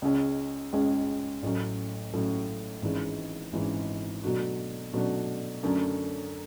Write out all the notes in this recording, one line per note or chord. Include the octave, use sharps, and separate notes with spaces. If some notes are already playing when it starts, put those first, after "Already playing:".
C#2 C#3 G#3 C#4
C#2 C#3 G#3 C#4
A1 A2 F#3 C#4
A1 A2 F#3 C#4
G#1 G#2 E3 G#3 C#4
G#1 G#2 E3 G#3 C#4
B2 F#3 A3 D4 F#4
B2 F#3 A3 D4 F#4
F#2 D3 F#3 A3 C#4